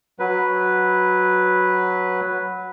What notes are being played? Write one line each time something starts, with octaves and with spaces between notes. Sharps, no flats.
F#3 B4